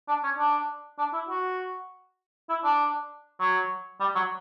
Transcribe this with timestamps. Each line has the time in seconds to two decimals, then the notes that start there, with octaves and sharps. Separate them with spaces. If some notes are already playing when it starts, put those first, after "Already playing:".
0.08 D4
0.24 C#4
0.38 D4
0.99 D4
1.13 E4
1.29 F#4
2.50 E4
2.64 D4
3.40 F#3
4.00 G3
4.15 F#3